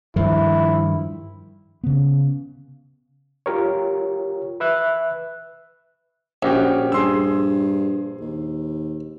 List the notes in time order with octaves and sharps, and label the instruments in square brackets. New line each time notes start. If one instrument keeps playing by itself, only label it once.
[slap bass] G2 D#3 F3 [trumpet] E4
[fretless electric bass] C#3 B3
[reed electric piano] F4 G4 A#4 C#5
B4 E5 F#6
[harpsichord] A#1 [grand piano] C#4 F#4 G4
[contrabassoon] G2 [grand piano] G#4 C6 E6
[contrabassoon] D#2